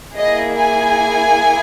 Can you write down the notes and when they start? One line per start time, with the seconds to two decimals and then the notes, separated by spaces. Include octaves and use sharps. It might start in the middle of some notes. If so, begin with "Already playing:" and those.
0.16 A#3 E4 G#4 D#5
0.55 G#5